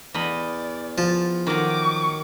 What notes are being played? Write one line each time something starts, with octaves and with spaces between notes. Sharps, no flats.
E2 D5 D#5 B5
F3 A5
D#3 F#3 D6